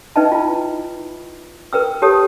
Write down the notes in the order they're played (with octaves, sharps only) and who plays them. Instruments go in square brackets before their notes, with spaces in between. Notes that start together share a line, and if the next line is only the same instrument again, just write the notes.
[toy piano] D#4 B4 D#5 E5 G5 A5
E4 F4
A#4 B4 G5 E6
G4 A4 C#5 A5 D#6